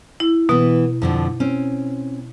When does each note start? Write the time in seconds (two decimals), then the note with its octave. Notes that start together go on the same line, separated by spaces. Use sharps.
0.20 E4
0.49 B2 E3 B3
1.02 F2 D3 F3
1.40 C4 C#4